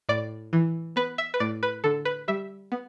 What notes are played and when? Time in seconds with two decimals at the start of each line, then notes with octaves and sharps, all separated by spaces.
0.09 A2 D5
0.53 E3
0.96 B3 B4
1.18 E5
1.34 B4
1.40 A2 D5
1.63 B4
1.84 D3 A4
2.05 B4
2.28 G3 E5
2.72 B3